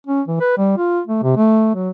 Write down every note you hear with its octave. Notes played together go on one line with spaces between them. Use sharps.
C#4
E3
B4
G3
F4
A3
C3
A3
F#3